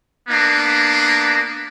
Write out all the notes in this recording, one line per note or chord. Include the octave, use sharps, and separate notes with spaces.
A#3 B3 D4